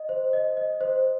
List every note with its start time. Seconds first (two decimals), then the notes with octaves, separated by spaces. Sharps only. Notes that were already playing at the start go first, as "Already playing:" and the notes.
Already playing: D#5
0.09 C5
0.33 D#5
0.57 D#5
0.81 C5